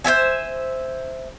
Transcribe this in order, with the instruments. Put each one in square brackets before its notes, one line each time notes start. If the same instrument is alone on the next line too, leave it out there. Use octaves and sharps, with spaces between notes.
[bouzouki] C5 C#5 E5 G#5